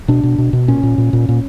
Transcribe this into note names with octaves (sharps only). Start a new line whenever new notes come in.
B2 D4
B2
B2
B2
A#2 C#4
A#2
A#2
A#2
A#2